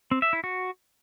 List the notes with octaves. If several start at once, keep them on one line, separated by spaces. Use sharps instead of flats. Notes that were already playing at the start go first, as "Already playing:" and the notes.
C4
E5
E4
F#4